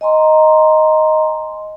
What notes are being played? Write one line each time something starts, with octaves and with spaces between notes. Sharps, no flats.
D#5 G#5 A#5 C6